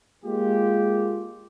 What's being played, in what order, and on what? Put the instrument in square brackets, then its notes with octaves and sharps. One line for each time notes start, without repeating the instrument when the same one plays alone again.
[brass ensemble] G#3 A#3 F4 G4